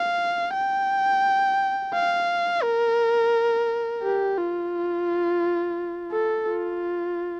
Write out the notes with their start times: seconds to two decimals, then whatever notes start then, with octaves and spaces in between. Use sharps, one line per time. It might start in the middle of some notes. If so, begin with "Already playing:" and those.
Already playing: F5
0.54 G5
1.94 F5
2.63 A#4
4.03 G4
4.38 F4
6.12 A4
6.48 F4